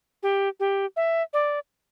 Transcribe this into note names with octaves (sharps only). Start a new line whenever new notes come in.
G4
G4
E5
D5